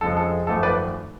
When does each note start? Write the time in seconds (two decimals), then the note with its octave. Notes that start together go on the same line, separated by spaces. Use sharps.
0.01 F2 C#3 F3 G#3 A4
0.17 A4
0.47 G#1 F#2 F3 A3 A4
0.63 B4 D5